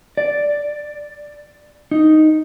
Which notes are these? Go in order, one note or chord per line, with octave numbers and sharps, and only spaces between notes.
D5
D#4